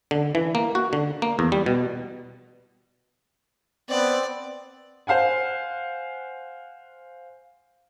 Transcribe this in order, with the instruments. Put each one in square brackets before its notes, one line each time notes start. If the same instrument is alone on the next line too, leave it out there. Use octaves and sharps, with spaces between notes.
[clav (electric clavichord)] D3
E3
A#3
F#4
D3
A#3
E2
G3
B2
[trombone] B3 [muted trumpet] C4 [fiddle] D5
[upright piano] C5 F5 F#5 G#5